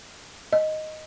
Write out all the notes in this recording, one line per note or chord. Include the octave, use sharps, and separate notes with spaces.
D#5